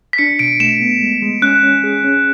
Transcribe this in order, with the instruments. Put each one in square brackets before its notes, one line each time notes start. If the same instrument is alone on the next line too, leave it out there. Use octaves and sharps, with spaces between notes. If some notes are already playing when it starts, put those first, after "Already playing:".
[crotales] B6
[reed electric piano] D4 [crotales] C#7
[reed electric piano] B2 [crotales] D7
[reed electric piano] A3 [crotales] E7
[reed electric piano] B3
G#3
G#3
[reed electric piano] C#4 [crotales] F#6
[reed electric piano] C#4
G#4
C#4